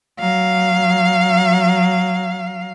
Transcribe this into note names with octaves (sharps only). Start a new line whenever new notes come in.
F#3 F5